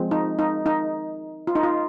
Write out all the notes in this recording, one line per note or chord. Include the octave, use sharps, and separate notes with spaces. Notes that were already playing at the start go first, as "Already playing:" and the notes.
Already playing: F3 G#3 C4
D#4
D#4
D#4
F4
D#4
F4